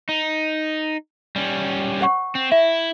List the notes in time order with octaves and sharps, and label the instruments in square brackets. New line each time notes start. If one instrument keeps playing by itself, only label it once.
[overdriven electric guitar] D#4
G3 C#4
[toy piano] C5 F#5 C#6
[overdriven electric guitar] C4
[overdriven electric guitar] E4 [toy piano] E5